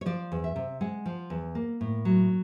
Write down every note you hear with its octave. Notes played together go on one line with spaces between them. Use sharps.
C#5
F3 D5
E2
E5
C3
G#3 F#5
F3
E2
A#3
A2
F#3